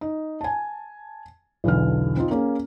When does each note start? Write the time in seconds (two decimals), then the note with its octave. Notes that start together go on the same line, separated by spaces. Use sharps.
0.01 D#4
0.41 G#5 A5
1.64 B1 E2 B2 D3 F6
2.17 C4 D#4 F4
2.31 A#3 C#4 G#4